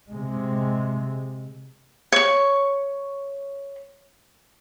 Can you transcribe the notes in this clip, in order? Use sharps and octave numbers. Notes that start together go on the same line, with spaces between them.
C3 G#3
C#5 C#6